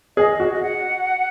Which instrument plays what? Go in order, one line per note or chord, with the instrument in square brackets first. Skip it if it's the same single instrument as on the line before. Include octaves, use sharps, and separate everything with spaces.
[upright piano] G#4 [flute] D#5
[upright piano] F#4
[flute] D#5
F#5